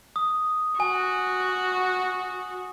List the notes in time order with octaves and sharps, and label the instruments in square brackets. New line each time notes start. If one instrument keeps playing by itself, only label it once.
[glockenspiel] D#6
[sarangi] F#4 [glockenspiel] G#5